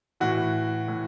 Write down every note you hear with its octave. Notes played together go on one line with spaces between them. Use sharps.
A2 E3 F#4
A2 E3